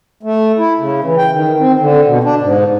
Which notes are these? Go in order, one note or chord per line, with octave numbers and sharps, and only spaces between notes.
A3
E4
C#3
E3
G5
D#3
C4
D3
B2
D4
G#2